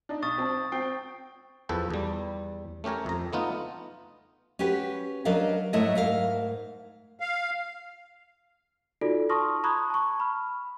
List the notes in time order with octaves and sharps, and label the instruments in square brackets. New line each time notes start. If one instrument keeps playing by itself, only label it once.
[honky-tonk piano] D4 D#4
[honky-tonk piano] B1 [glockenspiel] C#6 D#6 A6
[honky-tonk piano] C4 A5
C4 G5 C7
[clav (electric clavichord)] E2 F3 A4 B4 G5
E2 G3
A3 C#4 G4 A#4 C#5
F2 A#5
A3 B3 D#4 F4
[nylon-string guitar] C#4 F#4 G4 B4
F#3 D4 A#4 B4 D#5 F5
G#2 F#3 A3 E4 C#5 D#5
G#2 A#4 F5
[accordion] F5
[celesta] D#4 F4 F#4 A4 D5
A5 C6 C#6 D#6 F6 A#6
A#5 B5 C#6 D#6 F#6 G#6
A5 C#6
B5 F6